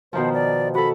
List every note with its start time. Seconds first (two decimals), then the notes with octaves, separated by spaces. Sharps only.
0.13 B2 D#3 F3 C5
0.34 D5
0.75 F#4 A4 B5